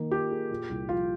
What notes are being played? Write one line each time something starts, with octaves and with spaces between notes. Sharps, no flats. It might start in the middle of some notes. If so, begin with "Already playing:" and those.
Already playing: D#3 A#3 D#4
F4 G4
G#4
A#2
C2
F3 F4